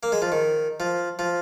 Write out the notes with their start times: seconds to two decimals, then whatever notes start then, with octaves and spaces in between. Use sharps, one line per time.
0.03 A#3
0.12 G#3
0.22 F3
0.32 D#3
0.80 F3
1.19 F3